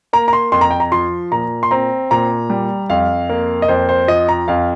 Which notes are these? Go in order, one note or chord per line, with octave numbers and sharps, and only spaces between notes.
A#3 A#5
A#5
C6
F2 C6
A#5
G5
A#5
F3 C6
A#2 A#5
C6
C4 A#5
A#2 A#5
G3
F2 F5
A#3
D#5
F2 C5
C5
F3 D#5
A#5
F2 F5